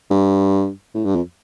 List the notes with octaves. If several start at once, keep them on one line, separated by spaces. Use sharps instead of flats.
G2
A2
G2
F2